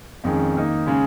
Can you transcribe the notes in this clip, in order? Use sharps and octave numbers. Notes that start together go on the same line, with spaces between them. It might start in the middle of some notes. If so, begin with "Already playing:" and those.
F2 D#3 G#3 C#4
D#3 A#3 D#4
C#3 G#3 C#4